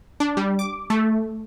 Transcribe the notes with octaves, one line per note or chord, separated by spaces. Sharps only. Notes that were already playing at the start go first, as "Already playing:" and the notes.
D4
G3
D6
A3